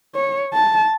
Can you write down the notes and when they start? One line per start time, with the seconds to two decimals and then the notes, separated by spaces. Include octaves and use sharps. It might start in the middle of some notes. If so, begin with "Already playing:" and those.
0.15 C#5
0.54 A5